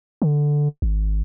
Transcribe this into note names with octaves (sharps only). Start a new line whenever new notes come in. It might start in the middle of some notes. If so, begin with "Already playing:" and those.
D3
G#1